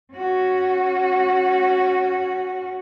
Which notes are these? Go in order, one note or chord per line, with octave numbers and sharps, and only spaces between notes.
C#4 F#4